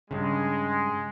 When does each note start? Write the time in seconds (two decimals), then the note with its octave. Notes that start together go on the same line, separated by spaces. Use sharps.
0.11 G2 C#3 G#3